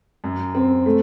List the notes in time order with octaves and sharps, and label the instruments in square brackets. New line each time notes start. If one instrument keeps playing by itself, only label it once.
[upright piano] F#2
C4
A3